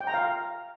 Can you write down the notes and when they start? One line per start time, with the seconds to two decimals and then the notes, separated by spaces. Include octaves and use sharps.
0.01 G5
0.07 A#5
0.14 F5